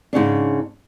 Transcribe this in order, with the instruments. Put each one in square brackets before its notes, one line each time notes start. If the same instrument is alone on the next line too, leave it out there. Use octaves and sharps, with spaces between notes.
[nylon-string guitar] G#2 C#3 C#4 D4